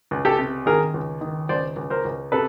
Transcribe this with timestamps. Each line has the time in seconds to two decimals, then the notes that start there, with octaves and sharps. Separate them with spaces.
0.11 C#2
0.25 G4 A4
0.39 C3
0.66 D#3 G#4 A#4
0.94 C#2
1.21 D#3
1.49 C#2 C5 D5
1.76 C#2
1.90 A#4 C5
2.05 C#2
2.32 C3 A4 B4